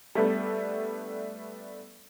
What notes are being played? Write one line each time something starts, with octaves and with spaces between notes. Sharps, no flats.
G3 A3 B3 D4